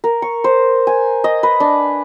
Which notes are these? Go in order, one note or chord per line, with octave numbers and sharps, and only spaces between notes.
A#4
C#6
C5
G#5
D#5
B4
D4